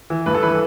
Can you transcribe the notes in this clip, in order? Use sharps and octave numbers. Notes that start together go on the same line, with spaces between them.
E3
G2 B4
A4
E3 B4
A4